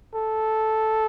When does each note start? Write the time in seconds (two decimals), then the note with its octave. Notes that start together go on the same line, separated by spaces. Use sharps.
0.15 A4